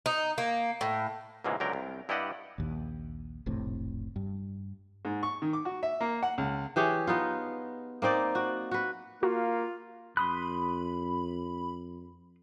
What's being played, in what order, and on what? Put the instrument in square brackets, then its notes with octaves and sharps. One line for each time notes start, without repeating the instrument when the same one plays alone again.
[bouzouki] D#4
A#3
A2
[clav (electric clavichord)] C#2 G#2 B2 E3 G#3 A#3
C#2 D3 F#3 A#4 G5
C2
G2 E4 G4 D5 D#5 F#5
[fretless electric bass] A#1 D#2
F1 A#1 A2 C3
G2
[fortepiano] G#2
C#6
D#3
D6
F#4
E5
A#3
F#5
C#2
[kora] E3 G4 G#4 C#5
B3 D#4 F4
A#3 C4 D#4 D5
F#4
F#4 B4
[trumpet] A#3 [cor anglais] F4 [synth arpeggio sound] F#4 A#5
[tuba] F2 [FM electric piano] B5 [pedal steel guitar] C6 D#6 F#6